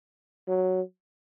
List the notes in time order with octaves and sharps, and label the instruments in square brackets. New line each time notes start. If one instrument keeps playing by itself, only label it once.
[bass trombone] F#3